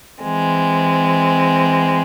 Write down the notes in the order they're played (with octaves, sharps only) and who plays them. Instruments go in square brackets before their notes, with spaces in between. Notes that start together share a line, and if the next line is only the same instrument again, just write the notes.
[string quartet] E3 G#3 C4